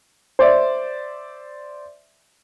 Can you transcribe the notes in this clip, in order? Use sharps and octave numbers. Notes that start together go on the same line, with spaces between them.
C5 D5 E5